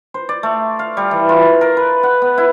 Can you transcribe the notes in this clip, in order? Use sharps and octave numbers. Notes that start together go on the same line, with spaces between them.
C5
D5
A3
F5
G3
E3
F4
A#4
B4
F#5
B3
E4